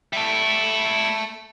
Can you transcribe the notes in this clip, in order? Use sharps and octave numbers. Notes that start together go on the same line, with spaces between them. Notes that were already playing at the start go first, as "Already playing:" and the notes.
G3 E4 E5 A5